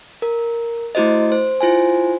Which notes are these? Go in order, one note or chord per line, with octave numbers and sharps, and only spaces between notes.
A#4
A3 E4 F#4 C5 D#5
C5
E4 F4 C5 G#5